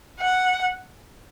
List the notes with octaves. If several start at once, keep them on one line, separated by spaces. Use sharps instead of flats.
F#5